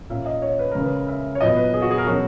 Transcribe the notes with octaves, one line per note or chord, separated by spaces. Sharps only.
A#2 A#3 C#4 E5
D#5
C#5
B4
C#3 G#3 C#4 A#4
B4
E5
C#5
A#2 F#3 B3 D#5
B4
G#4
F#4
G#4
A#4
B2 F#3 C#4 F#4